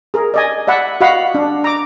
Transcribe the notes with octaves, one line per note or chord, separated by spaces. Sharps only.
G#4 A#4
D5 D#5 G#5
D5 E5 F#5 B5
F#4 D#5 F5 F#5 B5
D4
A#5 D6